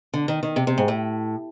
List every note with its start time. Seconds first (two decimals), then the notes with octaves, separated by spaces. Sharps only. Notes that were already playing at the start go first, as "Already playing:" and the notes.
0.14 D3
0.28 D#3
0.43 D#3
0.56 C3
0.67 C3
0.78 G#2
0.88 A2